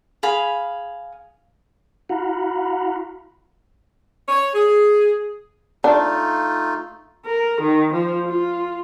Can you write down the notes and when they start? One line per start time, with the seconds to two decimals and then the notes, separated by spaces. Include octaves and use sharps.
0.23 G#4 F5 B5
2.09 E4 F#4 F5 F#5 A#5 B5
4.29 C#5
4.54 G#4
5.84 A3 D4 D#4 F4
7.25 A#4
7.61 D#3
7.93 F3 F4
8.26 F4